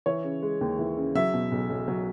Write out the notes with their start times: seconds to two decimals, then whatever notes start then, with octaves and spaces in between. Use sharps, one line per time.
0.06 E3 C#5
0.24 C#3
0.42 G#3
0.61 D#2
0.79 E3
0.97 C#3
1.15 F#3 E5
1.33 B2
1.52 B1
1.70 B1
1.88 F#3